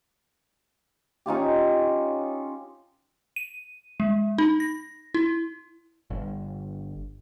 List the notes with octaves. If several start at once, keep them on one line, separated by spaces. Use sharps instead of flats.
C#4 D#4 F4 G4
D#7
G#3
D#4
A#6
E4
G1